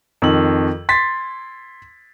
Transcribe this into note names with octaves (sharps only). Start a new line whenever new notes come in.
F2 D#3 E6 F#7
C6 A6 B6